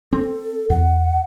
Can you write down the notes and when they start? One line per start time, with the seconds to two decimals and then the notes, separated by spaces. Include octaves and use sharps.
0.13 C4 A4
0.70 E2 F#5